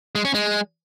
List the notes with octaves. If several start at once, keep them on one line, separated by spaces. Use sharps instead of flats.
G#3
C#4
G#3